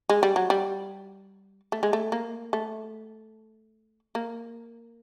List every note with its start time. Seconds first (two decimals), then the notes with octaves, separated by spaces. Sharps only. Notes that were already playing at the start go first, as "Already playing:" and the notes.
0.09 G#3
0.23 G3
0.36 F#3
0.50 G3
1.72 A3
1.83 G#3
1.93 A3
2.12 A#3
2.53 A3
4.15 A#3